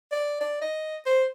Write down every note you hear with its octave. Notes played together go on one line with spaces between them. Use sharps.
D5
D5
D#5
C5